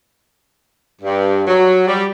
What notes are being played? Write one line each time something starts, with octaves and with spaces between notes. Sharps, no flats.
G2
F#3
G3